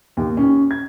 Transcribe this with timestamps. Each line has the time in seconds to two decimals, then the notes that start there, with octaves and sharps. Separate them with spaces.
0.17 D#2
0.37 C#4
0.71 G#6